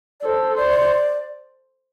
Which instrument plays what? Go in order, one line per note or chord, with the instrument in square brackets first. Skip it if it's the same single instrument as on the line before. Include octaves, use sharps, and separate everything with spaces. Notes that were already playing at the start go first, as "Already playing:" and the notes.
[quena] D5
[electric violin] A4 [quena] C5
[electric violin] C5 [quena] D5